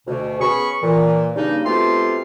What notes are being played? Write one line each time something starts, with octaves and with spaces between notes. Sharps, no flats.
D2 B2
B3 C#4 G#4 B5 C#6
A#2 E3
G2 C#3 G3 A#3 D4 D#4
B2 A3 C4 F4 G4 C6